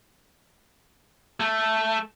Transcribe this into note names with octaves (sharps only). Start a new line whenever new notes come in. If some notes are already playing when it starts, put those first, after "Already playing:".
A3